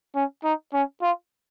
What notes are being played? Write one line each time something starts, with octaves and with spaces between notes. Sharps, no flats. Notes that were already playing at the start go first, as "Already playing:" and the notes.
C#4
D#4
C#4
F4